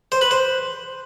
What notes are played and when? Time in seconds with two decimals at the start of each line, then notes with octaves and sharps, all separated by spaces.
0.12 C5
0.21 B4
0.31 C5